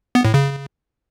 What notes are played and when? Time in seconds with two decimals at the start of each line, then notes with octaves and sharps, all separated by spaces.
0.15 B3
0.25 A2
0.34 C#3